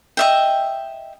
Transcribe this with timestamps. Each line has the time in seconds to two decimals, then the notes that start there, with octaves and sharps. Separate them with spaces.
0.17 D#5 E5 G5